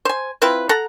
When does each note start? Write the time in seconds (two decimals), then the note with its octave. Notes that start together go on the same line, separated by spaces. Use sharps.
0.05 C5 G#5
0.42 C4 E4 F4 B4
0.69 A4 F#5 A#5